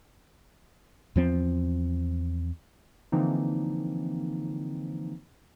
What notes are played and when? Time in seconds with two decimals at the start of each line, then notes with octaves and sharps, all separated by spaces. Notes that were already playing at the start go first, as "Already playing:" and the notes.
1.16 E2 F3 C4
3.12 D3 E3 F3 A#3 C4 D#4